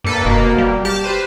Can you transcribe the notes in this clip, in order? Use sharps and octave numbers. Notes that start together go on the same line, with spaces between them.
G2 A#3 A4 B4
F1 B2 A#3
G3
G4 A5 F6 G6
B4 C5